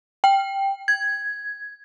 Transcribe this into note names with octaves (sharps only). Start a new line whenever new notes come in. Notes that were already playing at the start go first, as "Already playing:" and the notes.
G5
G#6